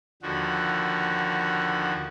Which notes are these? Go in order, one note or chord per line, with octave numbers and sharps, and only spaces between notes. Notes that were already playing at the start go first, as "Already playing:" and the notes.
D#2 D3 F3 F#4